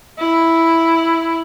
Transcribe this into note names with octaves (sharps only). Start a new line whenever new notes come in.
E4